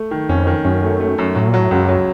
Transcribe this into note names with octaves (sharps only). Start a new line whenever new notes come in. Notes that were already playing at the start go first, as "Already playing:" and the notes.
Already playing: A3
D#3
F2 C#4
D#3
F#2 C#4
A3
A3
F#2
A2 F#3
A#2
F#3
A2
C#2 F#2
F#3